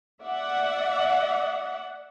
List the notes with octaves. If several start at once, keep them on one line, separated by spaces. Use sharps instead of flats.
D5 E5 F#5